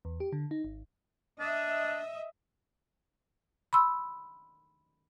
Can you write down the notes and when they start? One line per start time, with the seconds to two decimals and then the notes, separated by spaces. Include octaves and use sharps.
0.05 E2
0.20 G4
0.32 D3
0.51 D#4
0.64 G#1
1.40 D4 D#5 E5
3.73 B5 C6 E6